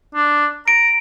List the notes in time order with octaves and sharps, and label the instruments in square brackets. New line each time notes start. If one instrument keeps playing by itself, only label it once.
[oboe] D4
[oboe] A#5 [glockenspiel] D7